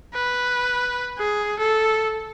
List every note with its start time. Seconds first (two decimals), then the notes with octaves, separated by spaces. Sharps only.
0.14 B4
1.19 G#4
1.59 A4